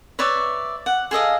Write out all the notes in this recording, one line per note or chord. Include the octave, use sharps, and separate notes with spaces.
B4 C#5 D5 E5
F#5
G#4 A4 D#5 F5